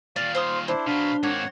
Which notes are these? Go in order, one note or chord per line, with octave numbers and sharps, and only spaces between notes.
A#2 D#3 D5 F5
C5 C6 D#6
D4 E4 C5
B2 F#3 D4 F5 B5
G#2 A#3 C4 C#5 F#5